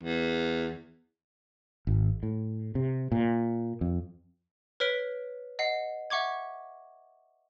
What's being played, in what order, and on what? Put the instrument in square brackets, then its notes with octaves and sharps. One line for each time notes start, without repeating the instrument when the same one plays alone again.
[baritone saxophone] E2
[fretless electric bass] G#1
A2
C3
A#2
F2
[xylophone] B4 C#5 F6 B6 D7 G7
D#5 F#5 C7
E5 F#5 C#6 D6 G#6